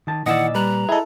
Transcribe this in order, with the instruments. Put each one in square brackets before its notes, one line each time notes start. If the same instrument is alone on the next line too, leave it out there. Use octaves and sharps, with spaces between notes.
[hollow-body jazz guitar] D#3 A5
[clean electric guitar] A#2 D5 [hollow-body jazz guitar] D#3 E3 [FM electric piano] D#5 E6 [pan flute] F#5
[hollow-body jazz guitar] G3 [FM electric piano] B4 F#6 [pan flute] A#5
[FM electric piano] E4 A4 [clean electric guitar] G#4 D#5